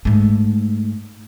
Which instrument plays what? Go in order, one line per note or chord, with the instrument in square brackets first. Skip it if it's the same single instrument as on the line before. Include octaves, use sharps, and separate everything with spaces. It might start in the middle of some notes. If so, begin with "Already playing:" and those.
[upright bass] G#2 A3